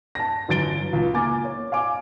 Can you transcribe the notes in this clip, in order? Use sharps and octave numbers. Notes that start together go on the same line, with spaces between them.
A5 A#6
G1 F#2 E3 A6 D7 G7
C#2
A#3 G#5 D6 A6
C#5
F5 G#5 D6